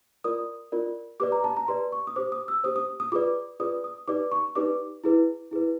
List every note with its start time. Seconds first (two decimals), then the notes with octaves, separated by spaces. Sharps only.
0.24 F4 A#4 D5 D#6
0.72 F4 A#4 D5
1.20 G4 B4 D5 D6
1.32 A#5
1.44 A5
1.57 A#5
1.68 G4 B4 D5 C6
1.92 C#6
2.07 D#6
2.16 G4 C5 D6
2.32 D#6
2.48 E6
2.64 G4 C5 D#6
2.76 D#6
3.00 D#6
3.12 F4 G#4 B4 D5 D6
3.60 F4 G#4 B4 D5 D#6
3.84 D#6
4.08 D#4 G4 B4 D5 D6
4.32 C#6
4.55 D#4 G4 B4 D5 D6
5.04 E4 G#4 B4
5.51 E4 G#4 B4